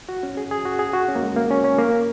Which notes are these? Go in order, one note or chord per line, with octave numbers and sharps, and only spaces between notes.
F#4
C#4
G#4
G#4
F#4
G#4
F#4
C#4
A#3
G#3
A#3
C#4
C#4
A#3